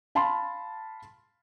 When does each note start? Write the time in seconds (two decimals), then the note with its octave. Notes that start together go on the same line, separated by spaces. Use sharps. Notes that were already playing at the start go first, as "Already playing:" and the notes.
0.15 F5 A5 B5 C6